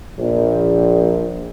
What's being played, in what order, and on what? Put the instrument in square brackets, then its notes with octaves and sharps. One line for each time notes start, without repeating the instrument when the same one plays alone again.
[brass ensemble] A#1